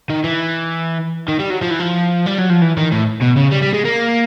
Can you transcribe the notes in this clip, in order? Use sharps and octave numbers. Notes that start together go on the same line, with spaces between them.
D#3
E3
D#3
G3
F#3
F3
E3
F3
G3
F#3
F3
E3
D#3
A2
B2
C#3
G3
G3
G#3
A#3